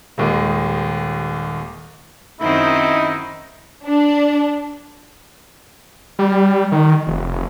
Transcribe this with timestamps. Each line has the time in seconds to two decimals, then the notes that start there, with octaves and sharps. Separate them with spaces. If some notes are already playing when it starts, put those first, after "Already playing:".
0.18 D#1 D#2 G#3
2.41 F#2 D#3 C4 D#4 E4
3.85 D4
6.19 G3
6.72 D#3
7.07 F1